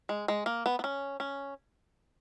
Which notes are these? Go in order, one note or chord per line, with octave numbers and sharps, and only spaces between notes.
G#3
G#3
A#3
B3
B3
C#4
C#4